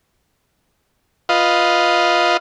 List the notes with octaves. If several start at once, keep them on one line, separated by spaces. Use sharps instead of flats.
F4 B4 D#5 F5